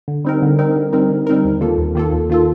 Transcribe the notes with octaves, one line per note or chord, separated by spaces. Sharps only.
D3
G3 C4 D#4 A#4
D3
G3 C4 D#4 A#4
D3
G3 C4 D#4 A#4
D3
G3 C4 D#4 A#4
D#2
D#3 A#3 F4 A4
D#2
D#3 A#3 F4 A4
D#2
D#3 A#3 F4 A4